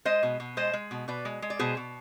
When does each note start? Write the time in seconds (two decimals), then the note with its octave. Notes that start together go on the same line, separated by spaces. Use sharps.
0.05 G#3 C5 D#5
0.23 B2
0.40 B2
0.57 G#3 C5 D#5
0.73 G#3
0.91 B2
1.08 B2 B4 D5
1.25 G#3
1.42 G#3
1.50 D5
1.59 B2 G#4 C5
1.77 B2